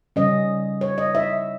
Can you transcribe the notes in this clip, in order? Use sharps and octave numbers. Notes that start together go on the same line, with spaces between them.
C#3 G3 C#4 D#5
C#5
D#5
E5